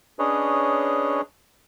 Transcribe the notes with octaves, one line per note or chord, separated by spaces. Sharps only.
C#4 D4 G#4 B4 C#5 D#5